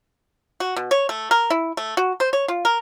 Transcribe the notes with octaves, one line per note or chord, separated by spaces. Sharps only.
F#4
B2
C#5
A3
A#4
E4
A3
F#4
C5
C#5
F4
A#4